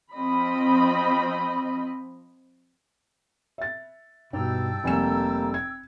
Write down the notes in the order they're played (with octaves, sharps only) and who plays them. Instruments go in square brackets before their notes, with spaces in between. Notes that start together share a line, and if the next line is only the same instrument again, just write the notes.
[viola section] F3 C4 D#5 B5
[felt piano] E5 A6
[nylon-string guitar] G2 D#4 [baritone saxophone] B2 [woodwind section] G5 A5 E6
[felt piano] F1 G#5 E7 [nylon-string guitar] G3 A3 [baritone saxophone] A#3
[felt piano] G#6